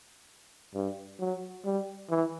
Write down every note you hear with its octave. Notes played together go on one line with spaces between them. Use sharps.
G2
F#3
G3
E3